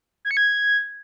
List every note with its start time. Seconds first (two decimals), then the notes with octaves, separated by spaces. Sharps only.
0.25 G#6
0.31 C#7
0.37 G#6